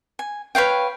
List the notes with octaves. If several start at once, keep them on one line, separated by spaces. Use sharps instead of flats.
G#5
B4 C#5 F5 G5